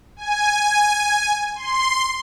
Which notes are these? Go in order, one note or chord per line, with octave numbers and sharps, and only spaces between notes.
G#5
C6